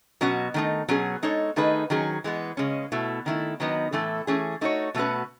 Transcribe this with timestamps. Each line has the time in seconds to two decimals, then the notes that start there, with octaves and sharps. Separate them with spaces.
0.21 B2 F#3 C#4 F#4
0.54 D#3 A3 D#4
0.88 B2 F#3 C#4 G#4
1.23 G#3 D#4 A4 C#5
1.56 D#3 A3 D#4 G#4 B4
1.90 D#3 F#3 C#4 G#4
2.24 E3 G#3 B3
2.57 C#3 G#3 C#4
2.92 B2 A3 E4
3.26 D#3 A3 E4
3.60 D#3 F#3 B3 D#4
3.93 A2 E3 A3 E4 A4
4.27 E3 A3 C#4 G#4
4.61 A3 D#4 F#4 C#5
4.95 B2 A3 C#4 F#4 B4